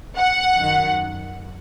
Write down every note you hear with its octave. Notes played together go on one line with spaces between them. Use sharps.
F#5
F#2 D#3